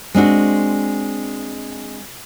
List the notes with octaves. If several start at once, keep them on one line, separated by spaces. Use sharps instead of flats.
G#3 C4 D4 F#4